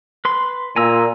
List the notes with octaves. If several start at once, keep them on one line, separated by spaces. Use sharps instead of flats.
B4 C6
A#2 G#5 A#5 E6